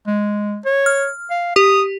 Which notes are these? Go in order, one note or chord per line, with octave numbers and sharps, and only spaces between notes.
G#3
C#5
F6
F5
G4 D#6